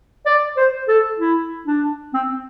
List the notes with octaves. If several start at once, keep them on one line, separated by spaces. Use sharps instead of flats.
D5
C5
A4
E4
D4
C4